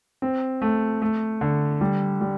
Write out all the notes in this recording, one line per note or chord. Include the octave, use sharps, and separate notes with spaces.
C4
A3
A3
D3
G3
G3